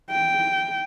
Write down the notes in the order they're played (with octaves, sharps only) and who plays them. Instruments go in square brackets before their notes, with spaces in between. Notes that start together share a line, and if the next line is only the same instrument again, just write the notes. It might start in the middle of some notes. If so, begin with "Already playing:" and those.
[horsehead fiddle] G5